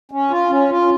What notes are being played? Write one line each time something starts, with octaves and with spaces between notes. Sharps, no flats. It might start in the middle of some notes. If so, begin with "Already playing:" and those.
C#4
F4
C#4
F4